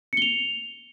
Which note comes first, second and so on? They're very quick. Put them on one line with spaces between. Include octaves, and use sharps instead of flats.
C#7 G7 F7